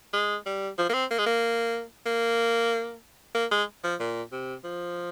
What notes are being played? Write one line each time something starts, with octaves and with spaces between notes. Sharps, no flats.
G#3
G3
F3
A#3
C4
A#3
G#3
A#3
A#3
A#3
G#3
F3
A#2
C3
F3